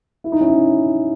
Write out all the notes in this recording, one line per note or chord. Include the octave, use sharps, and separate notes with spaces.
E4
D#4
C#4 E4